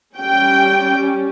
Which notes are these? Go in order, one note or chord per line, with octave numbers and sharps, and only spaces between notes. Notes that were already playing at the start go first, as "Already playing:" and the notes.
G3 C#4 G5